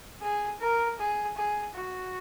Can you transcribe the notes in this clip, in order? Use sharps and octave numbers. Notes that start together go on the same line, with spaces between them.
G#4
A#4
G#4
G#4
F#4